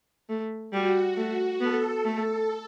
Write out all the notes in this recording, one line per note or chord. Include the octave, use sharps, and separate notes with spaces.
A3
G3 F#4
A3
B3 A4
A3 A4